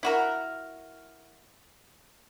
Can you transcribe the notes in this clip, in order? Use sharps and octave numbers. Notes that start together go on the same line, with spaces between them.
E4 F#4 A#4